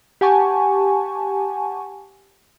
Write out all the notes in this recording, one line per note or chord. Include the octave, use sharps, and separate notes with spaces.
G4 F#5 G#5 A5 C#6